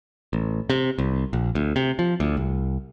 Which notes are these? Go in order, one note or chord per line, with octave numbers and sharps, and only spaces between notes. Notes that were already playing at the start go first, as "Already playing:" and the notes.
A1
C3
C2
A#1
D2
C3
F3
D2
C2